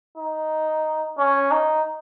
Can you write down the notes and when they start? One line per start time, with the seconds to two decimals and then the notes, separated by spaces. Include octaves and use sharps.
0.18 D#4
1.18 C#4
1.51 D#4